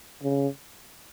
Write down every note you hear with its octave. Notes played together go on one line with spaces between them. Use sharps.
C#3